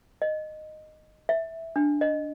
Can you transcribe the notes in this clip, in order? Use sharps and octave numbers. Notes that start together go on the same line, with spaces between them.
D#5
E5
D4
D#5